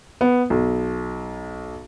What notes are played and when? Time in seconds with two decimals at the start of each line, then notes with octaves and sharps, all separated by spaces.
0.21 B3
0.50 B1